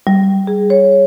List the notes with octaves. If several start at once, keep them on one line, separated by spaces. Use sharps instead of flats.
G3
G#4
C#5